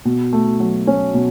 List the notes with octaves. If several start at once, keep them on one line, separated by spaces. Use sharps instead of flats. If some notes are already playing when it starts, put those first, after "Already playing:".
B2
A3
F#3
C#4
B2